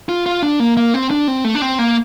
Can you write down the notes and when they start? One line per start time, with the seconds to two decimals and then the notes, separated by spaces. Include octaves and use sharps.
0.09 F4
0.26 F4
0.43 D4
0.60 A#3
0.77 A#3
0.94 C4
1.11 D4
1.28 C4
1.44 A3
1.55 D4
1.62 C4
1.79 A#3